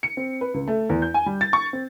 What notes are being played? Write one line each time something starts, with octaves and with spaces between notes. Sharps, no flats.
C#7
C4
B4
C#2
A3
E2
G6
G#5
G3
A6
C#6
C4